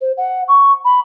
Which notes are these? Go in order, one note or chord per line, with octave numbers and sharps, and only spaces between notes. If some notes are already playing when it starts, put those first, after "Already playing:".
C5
F#5
C#6
B5